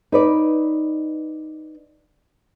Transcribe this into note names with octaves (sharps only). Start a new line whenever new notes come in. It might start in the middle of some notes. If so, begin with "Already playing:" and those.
D#4 B4 D5